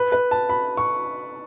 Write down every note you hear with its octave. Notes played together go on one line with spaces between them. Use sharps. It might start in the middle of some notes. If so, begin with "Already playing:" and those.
Already playing: B4
B4
A5
B5
C#6